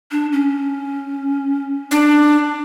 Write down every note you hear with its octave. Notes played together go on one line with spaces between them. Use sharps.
D4
C#4
D4